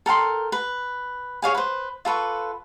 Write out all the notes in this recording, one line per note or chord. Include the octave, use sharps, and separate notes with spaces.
A4 A#4 G5 C6
B4
G#4 C#5 F5 G#5
B4 C5
F4 A4 B4 C#6